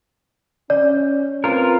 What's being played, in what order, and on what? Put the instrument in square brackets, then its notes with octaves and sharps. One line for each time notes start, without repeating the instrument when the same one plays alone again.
[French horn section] C#4 [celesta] D5
[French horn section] C4 B4 [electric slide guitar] F4 A#4